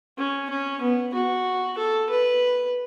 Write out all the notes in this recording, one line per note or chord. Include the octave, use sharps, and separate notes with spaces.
C#4
C#4
B3
F#4
A4
B4